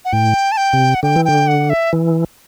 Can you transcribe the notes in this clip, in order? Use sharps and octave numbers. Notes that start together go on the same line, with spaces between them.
F#5
A2 G5
A5
G5
C3
F#5
D3 G5
E3
D3 G5
F#5
E5
E3